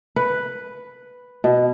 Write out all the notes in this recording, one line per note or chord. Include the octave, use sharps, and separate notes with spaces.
B4
B2